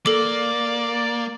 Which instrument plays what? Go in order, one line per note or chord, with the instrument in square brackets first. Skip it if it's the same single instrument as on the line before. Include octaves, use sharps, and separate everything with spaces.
[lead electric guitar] A#3 [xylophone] A4 D6 [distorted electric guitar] D5